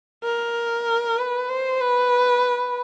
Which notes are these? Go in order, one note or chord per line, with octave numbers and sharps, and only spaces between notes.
A#4
B4
C5
B4